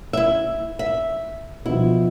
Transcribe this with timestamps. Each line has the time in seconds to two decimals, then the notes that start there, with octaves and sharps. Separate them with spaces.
0.13 E4 E5
0.79 E5
1.66 B2 F3 E4